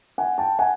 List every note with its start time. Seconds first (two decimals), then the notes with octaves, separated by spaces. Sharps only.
0.18 F#5 G#5
0.38 G5 A5
0.59 F#5 G#5